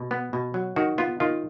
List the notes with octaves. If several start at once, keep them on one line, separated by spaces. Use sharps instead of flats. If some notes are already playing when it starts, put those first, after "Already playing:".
Already playing: B2
B3
B2
F#3
D#3 F#4
B3 F4
D#3 F4